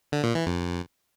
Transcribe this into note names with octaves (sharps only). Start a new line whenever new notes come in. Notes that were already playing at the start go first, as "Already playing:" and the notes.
D3
A#2
E3
F2